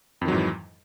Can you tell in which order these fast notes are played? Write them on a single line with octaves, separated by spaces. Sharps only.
F2 D#3 F#3 G#2 E3